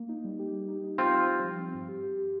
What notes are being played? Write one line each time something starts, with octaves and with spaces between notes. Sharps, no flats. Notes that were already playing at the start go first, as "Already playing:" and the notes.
Already playing: A#3
D#4
G3
G4
G3
D#4
D#4
C4 F4 G4
G3
G3
F3
C4
G2
G4
G4
G4